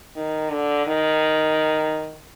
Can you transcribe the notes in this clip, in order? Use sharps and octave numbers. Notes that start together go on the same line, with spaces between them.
D#3
D3
D#3